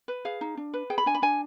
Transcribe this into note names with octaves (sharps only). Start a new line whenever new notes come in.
B4
G#4 F5
D#4
D4
B4
G#4 G5
B5
D4 G#5
B5
D4 G#5